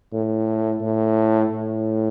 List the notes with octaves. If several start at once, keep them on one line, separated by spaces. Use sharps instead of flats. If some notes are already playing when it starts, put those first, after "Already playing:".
A2
A2
A2